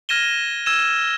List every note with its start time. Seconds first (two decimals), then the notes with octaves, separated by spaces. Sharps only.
0.09 F6 G#6 A#6 D#7 E7 G7
0.66 E6 G#6 D#7 E7